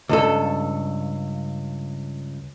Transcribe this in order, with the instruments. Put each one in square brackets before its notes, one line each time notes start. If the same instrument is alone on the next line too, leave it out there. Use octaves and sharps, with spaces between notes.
[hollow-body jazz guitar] C#2 G2 A4